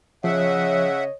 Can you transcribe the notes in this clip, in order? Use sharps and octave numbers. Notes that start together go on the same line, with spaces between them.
C#3 F3 C#5 D#5 E5 F#5